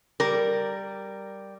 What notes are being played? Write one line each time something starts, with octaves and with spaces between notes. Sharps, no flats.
G3 A#4